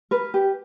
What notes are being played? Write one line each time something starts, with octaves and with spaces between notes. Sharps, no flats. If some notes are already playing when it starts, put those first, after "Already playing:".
A#4 B4
G4